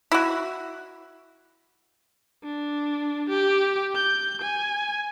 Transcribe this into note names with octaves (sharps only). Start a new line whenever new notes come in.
E4 F#4
D4
G4
G6
G#5